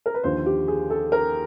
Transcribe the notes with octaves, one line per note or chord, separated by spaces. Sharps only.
A#4
B4
D#2 D3 F3 C5
G4
G#4
A4
A#4